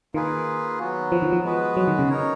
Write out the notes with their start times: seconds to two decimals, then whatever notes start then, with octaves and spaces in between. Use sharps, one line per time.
0.14 D#3 A#3 F4 G#4 B4
0.79 F#3 B3 F#4
1.12 F3
1.22 D#3
1.32 F3
1.44 G#3 B3 F#4 B4
1.77 F#3
1.88 D#3
1.99 C#3
2.10 D#4 A#4 C#5